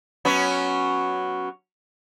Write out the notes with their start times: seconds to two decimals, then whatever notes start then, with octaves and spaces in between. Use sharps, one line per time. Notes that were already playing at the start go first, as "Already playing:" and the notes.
0.25 F#3 B3 C#4